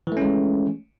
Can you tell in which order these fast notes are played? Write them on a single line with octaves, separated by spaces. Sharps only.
E3 A3 C#4 G#3